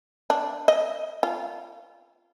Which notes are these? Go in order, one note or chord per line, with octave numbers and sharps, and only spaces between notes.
D4
D#5
F4